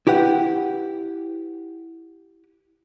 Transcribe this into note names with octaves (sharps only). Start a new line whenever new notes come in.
E4 G4 B4 F#5